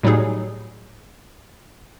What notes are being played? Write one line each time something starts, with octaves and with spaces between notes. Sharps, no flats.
A2 F#3 G3 D#4 G#4